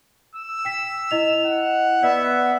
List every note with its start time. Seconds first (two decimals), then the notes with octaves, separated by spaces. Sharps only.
0.35 E6
0.65 G5 B6
1.11 E4 D#5 F7
1.46 F#5
2.03 B3 D5 E5